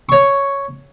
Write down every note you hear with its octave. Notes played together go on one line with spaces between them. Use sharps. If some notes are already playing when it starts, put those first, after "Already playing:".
C#5 C#6